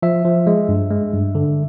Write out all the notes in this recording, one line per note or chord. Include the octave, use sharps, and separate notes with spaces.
F3 E5
F3
G#3
G2
G#3
G2
D3